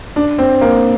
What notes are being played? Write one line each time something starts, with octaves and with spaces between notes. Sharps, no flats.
D4
C4
A#3